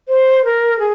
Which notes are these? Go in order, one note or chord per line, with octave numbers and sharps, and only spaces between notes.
C5
A#4
G#4